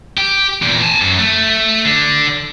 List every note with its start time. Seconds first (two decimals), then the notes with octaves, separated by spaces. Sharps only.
0.18 G4
0.62 E2 A#2
0.82 G#5 A5
1.01 F#2
1.19 A3
1.85 D3